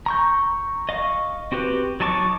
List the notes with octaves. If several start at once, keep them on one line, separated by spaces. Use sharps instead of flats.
A#5 C#6 G6
D#5 F5 C#6
C4 F#4 G4 B4
F#3 D#4 A5 C#6 D6